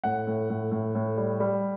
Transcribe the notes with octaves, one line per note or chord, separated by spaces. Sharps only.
A2 F#5
A2
A2
A2
A2
G3
G3